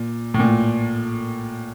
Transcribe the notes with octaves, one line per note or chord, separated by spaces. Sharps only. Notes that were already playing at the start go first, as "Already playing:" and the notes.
Already playing: A#2
A2
A#2